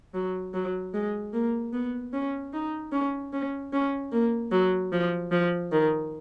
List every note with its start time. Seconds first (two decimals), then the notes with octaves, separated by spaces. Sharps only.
0.14 F#3
0.54 F#3
0.94 G#3
1.33 A#3
1.73 B3
2.13 C#4
2.53 D#4
2.92 C#4
3.33 C#4
3.73 C#4
4.12 A#3
4.52 F#3
4.92 F3
5.32 F3
5.72 D#3